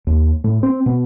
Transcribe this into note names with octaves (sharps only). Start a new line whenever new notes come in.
D#2
A2
C4
B2